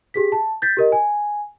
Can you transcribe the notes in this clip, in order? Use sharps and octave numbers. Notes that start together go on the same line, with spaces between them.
G4 G#4 B6
A5
G6 A6 B6
G4 A#4 D#5
G#5